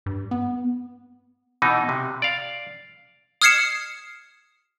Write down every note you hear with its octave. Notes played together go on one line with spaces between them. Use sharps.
G2
B3
B2 E3 D#4
C3
D5 F5
D#6 F6 G#6 C7 C#7 E7